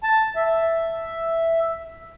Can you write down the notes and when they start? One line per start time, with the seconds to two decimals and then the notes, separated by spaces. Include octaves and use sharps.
0.03 A5
0.36 E5